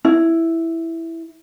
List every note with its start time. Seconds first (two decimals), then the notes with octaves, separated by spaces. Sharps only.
0.05 E4